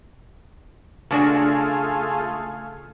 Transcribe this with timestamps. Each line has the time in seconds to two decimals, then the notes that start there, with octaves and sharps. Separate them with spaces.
1.11 C#3 A3 D4 F4 F#4 G#4